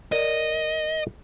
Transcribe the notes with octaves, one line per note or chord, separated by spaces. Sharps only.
A#4 D5 D#5